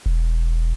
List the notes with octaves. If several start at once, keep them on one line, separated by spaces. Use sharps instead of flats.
E1